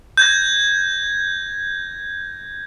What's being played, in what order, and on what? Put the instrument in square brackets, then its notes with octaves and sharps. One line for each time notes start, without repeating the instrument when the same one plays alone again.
[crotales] G6 G#6 A#6